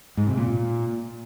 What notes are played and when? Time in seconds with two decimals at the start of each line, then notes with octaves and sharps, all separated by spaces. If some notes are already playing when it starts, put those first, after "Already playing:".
0.17 G#2
0.27 C3
0.38 A#2